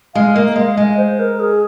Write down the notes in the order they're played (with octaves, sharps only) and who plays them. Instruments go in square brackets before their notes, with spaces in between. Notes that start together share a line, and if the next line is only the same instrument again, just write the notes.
[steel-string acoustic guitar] G#3 [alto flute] F5
[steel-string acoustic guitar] A#3 [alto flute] D#5
[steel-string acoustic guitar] G#3 [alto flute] F5
[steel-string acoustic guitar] G#3 [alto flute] D#5
[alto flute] C5
A#4
G#4